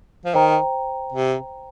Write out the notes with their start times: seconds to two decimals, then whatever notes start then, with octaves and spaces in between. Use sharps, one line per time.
0.25 F3
0.35 D#3 C5 G5 A#5
1.12 C3